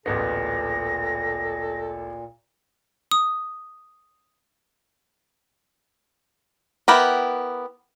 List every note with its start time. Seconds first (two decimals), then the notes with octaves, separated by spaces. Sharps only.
0.06 D1 A1 A#2 B3 A4 A#6
3.11 D#6
6.88 B3 E4 G4 A#4